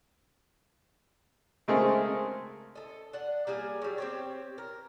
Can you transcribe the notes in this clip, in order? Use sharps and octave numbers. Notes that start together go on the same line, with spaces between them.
C#3 G#3 A3 C4 G#4 A#4
A4 D#5
D4 F#5
G3 A#3 G#4 F5
F#3 G3
C4 G4 C#5
A#4